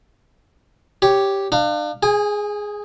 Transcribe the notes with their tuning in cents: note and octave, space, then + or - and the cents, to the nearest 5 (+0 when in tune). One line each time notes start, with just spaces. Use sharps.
G4 +0 C#5 +0
D4 +40 F5 +0
G#4 +0 G#5 -35